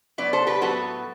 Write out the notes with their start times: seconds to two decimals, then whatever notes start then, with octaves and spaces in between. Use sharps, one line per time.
0.18 A2 F#3 B3 B4 D5
0.33 A4 C5
0.47 G4 B4
0.61 A2 F#3 B3 F#4 A4